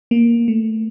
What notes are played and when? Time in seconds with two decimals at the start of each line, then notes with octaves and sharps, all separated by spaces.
0.11 A#3
0.48 A3